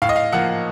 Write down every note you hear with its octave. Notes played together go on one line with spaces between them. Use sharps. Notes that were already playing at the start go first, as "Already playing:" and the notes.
A2 F5
D#5
F5
F3 A#3 F#5